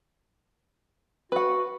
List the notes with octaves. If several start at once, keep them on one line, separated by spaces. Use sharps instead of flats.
F#4 B4 F#5